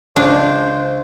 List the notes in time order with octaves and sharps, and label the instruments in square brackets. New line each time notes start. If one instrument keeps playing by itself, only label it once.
[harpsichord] C#2 [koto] D4 [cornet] C5